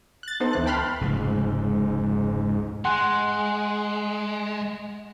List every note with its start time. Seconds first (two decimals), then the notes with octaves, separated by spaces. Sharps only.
0.23 F#6 A6
0.40 B3 D#4 A4 C5
0.53 D2 E3 F#6
0.66 G5 A5 B5 C6 F6 F#6
1.01 F1 C#2 G#2
2.85 G#3 F#5 G#5 C6 F#6